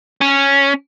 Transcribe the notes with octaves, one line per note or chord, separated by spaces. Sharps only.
C#4